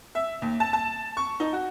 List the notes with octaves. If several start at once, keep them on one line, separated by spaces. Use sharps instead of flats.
E5
D#2
A5
A5
C#6
D#4
F#4